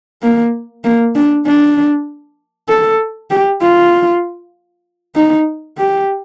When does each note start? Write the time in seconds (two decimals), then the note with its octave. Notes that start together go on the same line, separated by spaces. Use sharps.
0.22 A#3
0.84 A#3
1.15 D4
1.46 D4
2.69 A4
3.30 G4
3.62 F4
5.16 D#4
5.77 G4